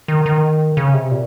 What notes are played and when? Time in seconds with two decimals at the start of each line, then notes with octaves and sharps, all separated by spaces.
0.08 D#3
0.26 D#3
0.77 C#3
0.94 C3
1.11 A#2